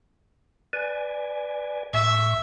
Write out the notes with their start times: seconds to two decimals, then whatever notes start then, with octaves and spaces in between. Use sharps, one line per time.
0.73 B4 D5 G#5
1.93 A2 E5 C#6